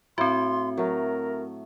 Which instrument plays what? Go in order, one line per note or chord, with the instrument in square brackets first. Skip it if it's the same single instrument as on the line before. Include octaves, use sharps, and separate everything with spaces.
[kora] A2 [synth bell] C4 F#4 [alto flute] C6
[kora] F#3 A3 [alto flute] A#4